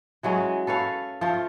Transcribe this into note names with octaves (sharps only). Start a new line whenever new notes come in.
E3 F#3 G#3 C#4
A4 B4 C#5 F5
F3 A3 F4